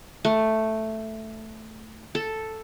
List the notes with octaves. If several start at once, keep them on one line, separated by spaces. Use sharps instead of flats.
A3
A4